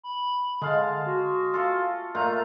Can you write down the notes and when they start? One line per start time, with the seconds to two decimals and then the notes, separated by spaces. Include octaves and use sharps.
0.03 B5
0.62 D3 G#3 F5 A5
1.06 F#4
1.54 F4 A4
2.15 A#2 A3 F4 A#5